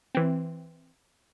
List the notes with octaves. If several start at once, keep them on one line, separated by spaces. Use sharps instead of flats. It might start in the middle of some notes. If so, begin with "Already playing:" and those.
E3 C4